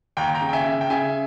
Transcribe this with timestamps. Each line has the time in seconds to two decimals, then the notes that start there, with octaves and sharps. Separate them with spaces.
0.17 D#2 G5 A#5
0.35 G5 A#5
0.41 C#3
0.49 G5
0.53 E5 G#5
0.65 C#3
0.81 G5
0.90 C#3 E5 G#5